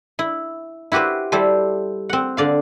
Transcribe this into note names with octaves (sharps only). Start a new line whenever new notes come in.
E4
E4 F#4 G4 B4 C5
G3 E4 A4 C5
C4 F#5
D3 D5 F5